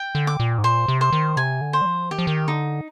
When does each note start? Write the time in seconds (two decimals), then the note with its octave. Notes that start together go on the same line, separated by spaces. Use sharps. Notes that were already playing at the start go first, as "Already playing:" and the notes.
Already playing: G5
0.15 D3
0.27 D6
0.40 A#2
0.58 G#2
0.64 A#2 C5
0.88 C3
1.01 C5
1.12 D#3
1.37 C3 G#5
1.61 D3
1.73 C5
1.81 G3
1.86 F3
2.11 D#3 G4
2.18 F3
2.27 D#3
2.48 D3 D#4